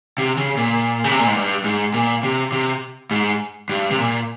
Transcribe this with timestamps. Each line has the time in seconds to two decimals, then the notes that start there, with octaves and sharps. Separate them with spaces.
0.18 C3
0.37 C#3
0.57 A#2
1.04 C#3
1.11 C3
1.19 A#2
1.27 G#2
1.35 G2
1.64 G#2
1.94 A#2
2.23 C3
2.52 C3
3.11 G#2
3.69 G2
3.91 C3
3.99 A#2